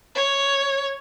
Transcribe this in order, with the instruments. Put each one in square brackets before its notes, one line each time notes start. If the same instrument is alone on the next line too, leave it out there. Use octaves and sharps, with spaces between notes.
[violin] C#5